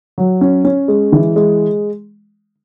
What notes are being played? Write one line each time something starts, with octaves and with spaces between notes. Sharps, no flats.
F#3
C#4
C#4
G#3
E3
G#3